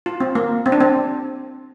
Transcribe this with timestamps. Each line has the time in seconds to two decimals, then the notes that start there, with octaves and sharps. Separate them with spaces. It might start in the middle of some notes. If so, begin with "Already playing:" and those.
0.06 F4
0.20 C4
0.35 A#3
0.66 C4
0.72 D4
0.80 C4